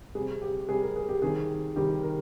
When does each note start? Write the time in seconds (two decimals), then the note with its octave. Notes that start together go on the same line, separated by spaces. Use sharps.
0.15 G3 G#4
0.20 C3
0.42 G4
0.69 C3 G3 G#4
0.82 A#4
0.96 G#4
1.09 G4
1.22 C3 D#3 G3 G#4
1.76 C3 D#3 G3 G4
2.03 A#4